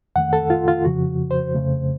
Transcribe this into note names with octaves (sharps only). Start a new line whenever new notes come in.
F2 D#3 A3 F#5
A4
F4
F4
F2 C#3 F3 F#4
C5
F2 C#3 A3